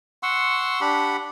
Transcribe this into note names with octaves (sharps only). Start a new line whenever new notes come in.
F#5 C6 C#6 E6
D4 G4 F#5 B5